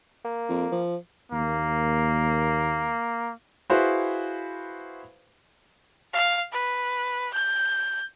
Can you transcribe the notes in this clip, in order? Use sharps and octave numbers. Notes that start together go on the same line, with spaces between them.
A#3
F2
F3
D#2 A#3
E4 F#4 G#4 B4 C5 F5
F5
B4
G6